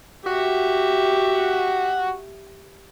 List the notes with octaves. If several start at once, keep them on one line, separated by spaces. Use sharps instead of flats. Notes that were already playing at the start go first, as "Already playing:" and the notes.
F#4 G4 E5